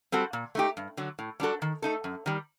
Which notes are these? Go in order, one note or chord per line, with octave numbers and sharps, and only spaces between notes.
G3 C4 F#4 A4
A#2
A3 D#4 G4
G2
D3 F#3
A2
G3 D4 F#4 A4
D#3
A3 D#4 A4
F#2
D#3 G3